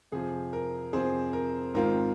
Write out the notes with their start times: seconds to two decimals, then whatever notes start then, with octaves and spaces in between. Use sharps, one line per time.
0.12 F2 C3 F3 C4 G#4
0.53 A#4
0.93 F2 C3 F3 C4 G#4 C5
1.33 A#4
1.74 G#1 G#2 D#3 C4 F4 A#4